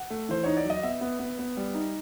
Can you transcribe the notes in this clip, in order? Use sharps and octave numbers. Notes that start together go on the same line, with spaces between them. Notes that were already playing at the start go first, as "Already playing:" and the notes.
Already playing: F#5
A3
E3 C5
D#4 C#5
D5
F#3
D#5
B3 E5
B3
B3
B3
G3
D#4